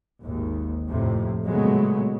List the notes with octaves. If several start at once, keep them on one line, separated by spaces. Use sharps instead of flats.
G#1 D#2
F2 A2 C3
A#2 C#3 F#3 G#3 A3 B3